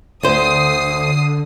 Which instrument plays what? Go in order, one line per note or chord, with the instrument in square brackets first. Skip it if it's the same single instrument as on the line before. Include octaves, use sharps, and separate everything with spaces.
[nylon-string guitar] D2 C5 [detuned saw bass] D3 [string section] D#6 C7